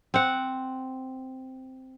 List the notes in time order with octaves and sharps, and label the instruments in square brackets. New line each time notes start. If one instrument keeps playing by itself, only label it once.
[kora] C4 F#5